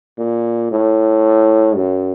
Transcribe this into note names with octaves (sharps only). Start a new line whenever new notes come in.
A#2
A2
F#2